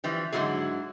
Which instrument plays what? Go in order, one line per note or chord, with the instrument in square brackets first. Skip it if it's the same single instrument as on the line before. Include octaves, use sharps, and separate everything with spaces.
[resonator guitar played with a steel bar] E3 F3 G3
G#2 D3 F3 F#3 E4 G#4